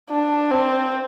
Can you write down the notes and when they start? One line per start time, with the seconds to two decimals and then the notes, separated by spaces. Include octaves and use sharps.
0.11 D4
0.51 C4